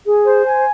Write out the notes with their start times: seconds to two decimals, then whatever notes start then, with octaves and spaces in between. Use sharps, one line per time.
0.04 G#4
0.25 C5
0.45 G#5